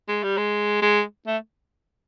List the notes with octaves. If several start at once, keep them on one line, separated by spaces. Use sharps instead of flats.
G#3
G3
G#3
G#3
A3